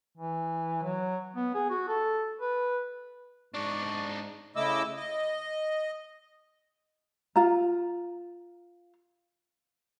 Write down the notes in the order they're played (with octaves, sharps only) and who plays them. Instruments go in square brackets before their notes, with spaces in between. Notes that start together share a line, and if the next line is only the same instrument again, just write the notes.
[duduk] E3
F#3
B3
G#4
F#4
A4
B4
[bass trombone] G#2 [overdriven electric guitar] D4 D#4 [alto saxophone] D5 [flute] C#6
[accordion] C#3 A3 E4 D#5 D6 E6
D#5
[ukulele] F4 A#5